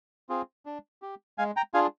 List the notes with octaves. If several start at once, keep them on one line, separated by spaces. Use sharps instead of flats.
C4 F4 G#4
D4
G4
G#3 F5 G#5
G5 A#5
D4 F4 G#4 F5 G#5